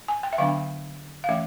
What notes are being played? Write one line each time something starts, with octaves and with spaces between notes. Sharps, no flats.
G#5
G5
E5
D3 F#3 B3 D4 F5
F5
E3 A3 C#4 E5